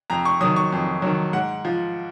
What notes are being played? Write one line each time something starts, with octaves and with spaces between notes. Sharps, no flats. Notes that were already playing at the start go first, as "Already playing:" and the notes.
F2 A#5
C#6
D#3 F#3 D#6
C#6
F2
D#3 F#3
G#2 F#5
F3